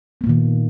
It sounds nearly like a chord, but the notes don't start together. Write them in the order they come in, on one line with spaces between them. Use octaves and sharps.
B3 A#3 A#2 D#3